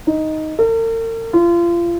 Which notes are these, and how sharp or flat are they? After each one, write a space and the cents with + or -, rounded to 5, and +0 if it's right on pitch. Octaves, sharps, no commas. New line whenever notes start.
D#4 +5
A#4 -45
F4 -30